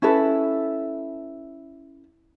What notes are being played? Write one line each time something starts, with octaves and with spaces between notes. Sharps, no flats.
C#4 E4 A4 B4